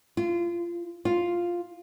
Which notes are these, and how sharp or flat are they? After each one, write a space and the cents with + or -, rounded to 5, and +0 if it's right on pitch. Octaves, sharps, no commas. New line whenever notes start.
F4 -25
F4 +0